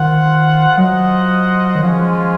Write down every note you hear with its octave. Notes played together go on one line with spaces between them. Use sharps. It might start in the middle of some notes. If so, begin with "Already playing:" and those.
Already playing: D#3 F4 C5 F#5
F#3 F4 C5 D#5 F#5
D#3
F3 G#3 C#4 F4